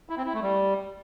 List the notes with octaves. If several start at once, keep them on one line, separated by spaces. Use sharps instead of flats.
E4
C4
E4
A3
G3